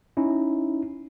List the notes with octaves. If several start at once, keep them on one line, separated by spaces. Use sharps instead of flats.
C#4 D#4 E4